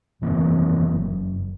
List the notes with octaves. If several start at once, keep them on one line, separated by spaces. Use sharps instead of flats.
F1 E3 A#3 C4
F#1